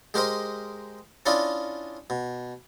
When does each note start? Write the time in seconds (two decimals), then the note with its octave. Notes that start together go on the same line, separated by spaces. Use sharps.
0.14 G#3 G4 A#4 C5 D#5
1.26 C#4 D4 E4 F4 D5 D#5
2.10 B2